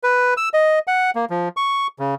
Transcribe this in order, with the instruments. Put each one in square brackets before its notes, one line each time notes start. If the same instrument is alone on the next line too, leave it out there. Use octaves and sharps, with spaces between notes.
[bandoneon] B4
E6
D#5
F#5
A#3
F3
C#6
C#3